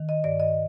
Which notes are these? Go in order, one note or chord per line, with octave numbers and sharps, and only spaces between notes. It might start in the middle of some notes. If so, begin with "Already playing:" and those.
Already playing: D#3
D#5
G2 D5
D#5